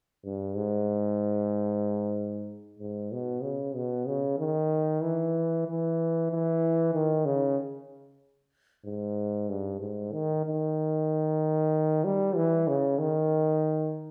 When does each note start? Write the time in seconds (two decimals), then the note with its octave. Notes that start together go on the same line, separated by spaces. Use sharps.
0.24 G2
0.56 G#2
2.79 G#2
3.12 B2
3.43 C#3
3.75 B2
4.07 C#3
4.39 D#3
5.02 E3
5.67 E3
6.31 E3
6.93 D#3
7.25 C#3
8.85 G#2
9.49 G2
9.80 G#2
10.12 D#3
10.45 D#3
12.05 G3
12.35 E3
12.68 C#3
12.99 D#3